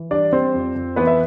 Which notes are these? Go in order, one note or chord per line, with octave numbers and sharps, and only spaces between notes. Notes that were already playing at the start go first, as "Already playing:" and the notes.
Already playing: E3
G3 D4 D5
G3 C4 C5
F2
F2
E3 B3 B4
E5